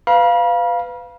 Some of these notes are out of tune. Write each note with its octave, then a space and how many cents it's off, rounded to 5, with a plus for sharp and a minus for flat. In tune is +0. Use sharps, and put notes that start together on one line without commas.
B4 +25 F5 +0 B5 -40